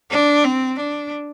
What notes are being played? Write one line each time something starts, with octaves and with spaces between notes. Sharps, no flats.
D4
C4
D4